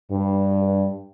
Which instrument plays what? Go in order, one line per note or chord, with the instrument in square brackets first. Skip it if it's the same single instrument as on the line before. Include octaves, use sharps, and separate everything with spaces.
[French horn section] G2